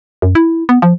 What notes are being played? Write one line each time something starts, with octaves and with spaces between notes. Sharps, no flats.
F#2
E4
B3
F3